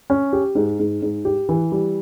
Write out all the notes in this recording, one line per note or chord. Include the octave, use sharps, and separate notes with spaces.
C#4
G4
G#2
G#2
G#2
G4
E3
G3